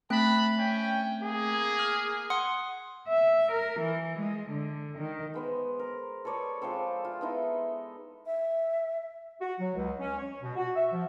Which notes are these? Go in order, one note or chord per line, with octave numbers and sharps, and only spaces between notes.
A3 C4 A5 B5 F#6
C#4 G5
A#3 G#4
F6
F#5 C6 D#6
E5
A#4
E3
G#3
D3
D#3
G#3 B3 C5
A#4
A4 B4 C#5 D5
F3 G#3 C4 A4
F4
B3 D#4 E4
E5
F#4
F#3
C#2
C#4
C#5
B2
F#4
E5
F3